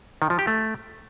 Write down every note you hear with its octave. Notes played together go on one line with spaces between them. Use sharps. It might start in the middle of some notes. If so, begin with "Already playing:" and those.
D#3
F3
G4
A3